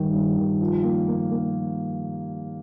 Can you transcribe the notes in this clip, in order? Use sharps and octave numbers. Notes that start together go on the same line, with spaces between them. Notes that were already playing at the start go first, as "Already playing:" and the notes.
Already playing: G2 D#3
G2
D#3
F3
A#3
A#3
A#3